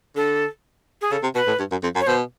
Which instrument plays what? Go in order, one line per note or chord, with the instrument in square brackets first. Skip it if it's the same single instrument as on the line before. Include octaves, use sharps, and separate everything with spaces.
[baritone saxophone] D3 [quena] A4
[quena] G#4
[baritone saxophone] C#3 [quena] A4
[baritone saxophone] C3
[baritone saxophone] B2 [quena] B4
[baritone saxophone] A2
G2
F#2
F2
F#2
[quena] C#5
[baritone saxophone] B2 [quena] C5